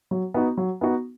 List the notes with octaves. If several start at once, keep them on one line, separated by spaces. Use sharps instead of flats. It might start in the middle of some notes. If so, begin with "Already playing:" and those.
F#3
B3 D#4 F#4
F#3
B3 D#4 F#4